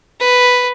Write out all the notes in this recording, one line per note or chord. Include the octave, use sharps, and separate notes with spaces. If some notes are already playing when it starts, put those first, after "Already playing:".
B4